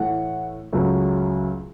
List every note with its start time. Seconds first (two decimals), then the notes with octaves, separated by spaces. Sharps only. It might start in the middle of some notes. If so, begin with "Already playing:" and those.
Already playing: A2 E3 A3 F#5
0.73 C#2 C#3 F#3 A3